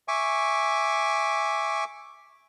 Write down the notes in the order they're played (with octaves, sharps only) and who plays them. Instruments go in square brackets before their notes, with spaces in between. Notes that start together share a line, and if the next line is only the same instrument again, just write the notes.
[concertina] E5 G#5 C#6 D6